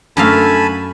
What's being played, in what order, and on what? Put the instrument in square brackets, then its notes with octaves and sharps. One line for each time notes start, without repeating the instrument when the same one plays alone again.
[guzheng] F#2 F#4 F5 [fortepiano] D3 A3 [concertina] G#5 A5 B5